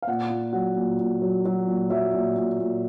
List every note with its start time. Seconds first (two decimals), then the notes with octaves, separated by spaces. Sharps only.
0.02 F5
0.07 A#2 F#5
0.30 A#2
0.53 F#3 F#5
0.77 A#2
1.00 A#2
1.22 F#3
1.45 F#3
1.67 A#2
1.90 F#3 E5
2.14 A#2
2.37 A#2
2.60 A#2